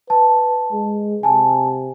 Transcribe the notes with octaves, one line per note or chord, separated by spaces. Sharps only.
B4 A5
G#3
C3 G#5 A5